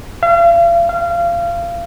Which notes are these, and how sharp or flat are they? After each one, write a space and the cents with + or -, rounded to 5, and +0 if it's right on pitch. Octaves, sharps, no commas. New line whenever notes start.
F5 -40
F5 -25